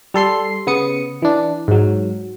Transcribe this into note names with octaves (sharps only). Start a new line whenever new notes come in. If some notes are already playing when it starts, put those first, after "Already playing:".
G3 A4 C6 C7
C#3 B3 D#6 C#7
E3 D4
G#2 F#3